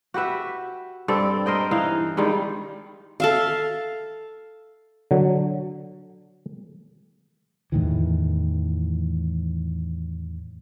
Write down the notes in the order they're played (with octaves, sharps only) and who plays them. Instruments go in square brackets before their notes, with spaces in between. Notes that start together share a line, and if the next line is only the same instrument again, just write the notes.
[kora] F#4 G4 B4 E5
G2 C4 A4 D5
A#4 C5 D#5 G5
E3 D#4 F5
G2 D#3 G3 G#3
[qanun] A4 E5 F5
[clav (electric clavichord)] D3 F#3
[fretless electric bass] E2 A2 D#3 E3